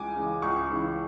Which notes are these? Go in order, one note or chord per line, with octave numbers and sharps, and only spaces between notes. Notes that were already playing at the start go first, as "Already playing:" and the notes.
Already playing: C#2 C#3 E3 G#3 G#5 D6
C#3 E3 G#3
C#2 C#6
C#3 E3 G#3